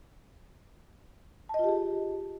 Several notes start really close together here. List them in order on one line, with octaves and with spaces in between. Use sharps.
A5 D#5 F4 G4 G#4